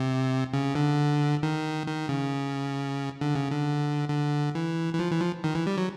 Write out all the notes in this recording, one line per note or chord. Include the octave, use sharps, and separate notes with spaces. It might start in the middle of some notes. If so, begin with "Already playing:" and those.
Already playing: C3
C#3
D3
D#3
D#3
C#3
D3
C#3
D3
D3
E3
E3
F3
E3
F3
D#3
E3
G3
F#3